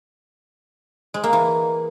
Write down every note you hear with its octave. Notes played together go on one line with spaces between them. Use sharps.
G#3
A#3
E3